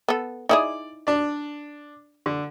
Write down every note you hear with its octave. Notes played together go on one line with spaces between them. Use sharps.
B3 A4
D#4 E4 G#4 D5
D4 D5
D3